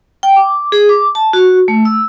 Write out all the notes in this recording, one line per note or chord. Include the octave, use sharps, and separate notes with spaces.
G5
D6
G#4
D6
A5
F#4
A3
E6